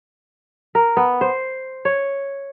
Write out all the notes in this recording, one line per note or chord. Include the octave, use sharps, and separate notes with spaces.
A#4
B3
C5
C#5